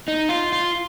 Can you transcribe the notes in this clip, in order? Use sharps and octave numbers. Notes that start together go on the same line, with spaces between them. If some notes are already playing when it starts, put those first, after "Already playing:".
D#4
F4
F4